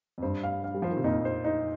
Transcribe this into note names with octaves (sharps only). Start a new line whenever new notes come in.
F2
G2 C5
F5
F5
G3
F3 C5
D#3
C3
F2 A#2 D#4
C5
D#4